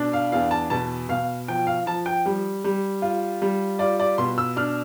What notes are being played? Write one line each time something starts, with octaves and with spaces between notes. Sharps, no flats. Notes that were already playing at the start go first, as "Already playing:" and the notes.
Already playing: B2 D4
F5
E2 F5
A5
B2 A5
B2 F5
F3 G5
F5
F3 A5
G5
G3
G3
F4
G3
F4 D5
D5
B2 C6
E6
D4 F6